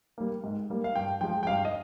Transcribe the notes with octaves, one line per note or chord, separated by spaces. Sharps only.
G3 A#3
G#2
G3 A#3
F5
G2 G5
F3 G#3 G5
G5
G2 F5
D#5